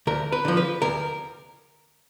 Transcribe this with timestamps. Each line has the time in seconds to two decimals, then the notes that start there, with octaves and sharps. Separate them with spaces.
0.07 D2 A#4
0.32 B4
0.45 D3 F3
0.57 B4
0.82 D2 A#4